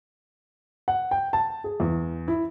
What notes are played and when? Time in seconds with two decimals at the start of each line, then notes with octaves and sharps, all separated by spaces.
0.88 F#5
1.11 G5
1.33 A5
1.64 G#4
1.80 E2
2.28 E4